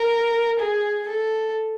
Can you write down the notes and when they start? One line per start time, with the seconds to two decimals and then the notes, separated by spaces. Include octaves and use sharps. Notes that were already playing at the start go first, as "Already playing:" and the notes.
Already playing: A#4
0.59 G#4
1.08 A4